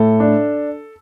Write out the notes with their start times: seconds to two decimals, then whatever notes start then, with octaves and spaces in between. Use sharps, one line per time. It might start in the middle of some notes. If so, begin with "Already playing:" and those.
Already playing: A2 A4
0.20 D4